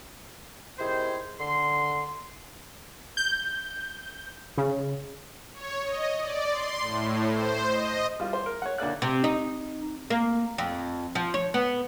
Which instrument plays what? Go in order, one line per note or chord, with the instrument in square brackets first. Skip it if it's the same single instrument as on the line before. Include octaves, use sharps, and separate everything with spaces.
[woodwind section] C3 D#3 E4 G#4 C5
D3 C6
[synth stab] G6
C#3
[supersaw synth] C#5
D#5
D5
C6
A2
C5
D#5
[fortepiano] G3 F4
C5
A#4
C#5 F#5
D2 A#3 D5 F#6
[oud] C3
D#4
A#3
F2
F3
C#5
B3